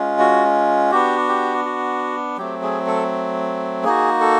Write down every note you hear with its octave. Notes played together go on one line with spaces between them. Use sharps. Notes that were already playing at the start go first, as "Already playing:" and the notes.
Already playing: G#3 C#4 F4
F#4
B3 D4 F#4 G4
G4
F#4
F#3 A3 C4 G4
G#4
A4
A#3 D#4 F#4 G#4
A4